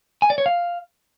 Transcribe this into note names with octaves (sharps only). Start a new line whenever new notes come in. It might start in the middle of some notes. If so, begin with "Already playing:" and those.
G#5
D5
C#5
F5